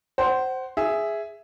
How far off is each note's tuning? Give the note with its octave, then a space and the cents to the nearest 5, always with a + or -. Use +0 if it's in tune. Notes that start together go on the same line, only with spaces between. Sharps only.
C5 +0 F#5 +30
G#4 +0 E5 +0